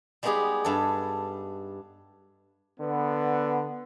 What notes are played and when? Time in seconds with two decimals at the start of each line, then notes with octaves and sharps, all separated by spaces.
0.23 G3 G#3 B3 D#4 G4 G#4
0.65 G2 A4
2.80 D3 B3